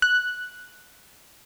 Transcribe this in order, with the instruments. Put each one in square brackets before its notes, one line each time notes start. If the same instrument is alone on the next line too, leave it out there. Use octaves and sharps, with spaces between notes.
[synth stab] F#6